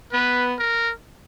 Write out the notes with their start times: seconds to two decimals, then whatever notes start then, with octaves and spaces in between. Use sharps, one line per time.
0.13 B3 B4
0.59 A#4